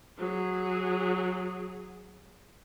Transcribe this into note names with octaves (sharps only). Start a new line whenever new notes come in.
F#3 G#4